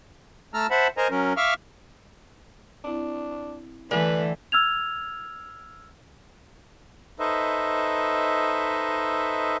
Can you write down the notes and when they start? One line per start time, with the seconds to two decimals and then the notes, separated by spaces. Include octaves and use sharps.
0.54 A3 A5 A#5 E6 F6
0.71 C5 E5 F#5 A5 B5
0.97 A#4 C5 D#5 G#5 A#5
1.11 F#3 C#4 A#4
1.37 E5 F5 C#6 D6 E6 F6
2.84 C4 D4 E4
3.91 D3 E3 A3 B4 G#5 F#6
4.52 E6 F6 G#6 F7
7.19 D#4 A4 B4 C5 D#5 E5